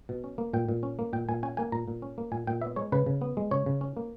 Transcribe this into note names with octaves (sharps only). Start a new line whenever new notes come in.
B2
C#4
A#3
A#2 G5
A#2
C#4
A#3
A#2 G5
A#2 G#5
C#4 G#5
A#3 G#5
A#2 A#5
A#2
C#4
A#3
A#2 G#5
A#2 G5
B3 E5
G#3 C#5
C#3 B4
C#3
B3
G#3
C#3 C#5
C#3
C#4
A#3